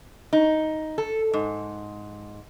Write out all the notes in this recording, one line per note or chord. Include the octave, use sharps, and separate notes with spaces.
D#4
A4
G#2